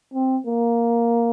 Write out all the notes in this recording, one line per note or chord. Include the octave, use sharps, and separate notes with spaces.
C4
A#3